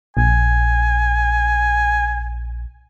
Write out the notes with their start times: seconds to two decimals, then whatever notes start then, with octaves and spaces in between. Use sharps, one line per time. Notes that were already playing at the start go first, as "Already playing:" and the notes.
0.17 A#1 G#5